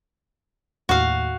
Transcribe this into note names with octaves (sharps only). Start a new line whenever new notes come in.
D#2 A2 F#4 F5